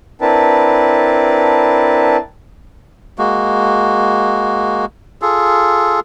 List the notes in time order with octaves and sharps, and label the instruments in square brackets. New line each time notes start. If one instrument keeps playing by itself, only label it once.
[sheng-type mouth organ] C4 D4 E4 A#4 B4 A5
[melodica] G#3 A#3 F#4
F4 G#4 A4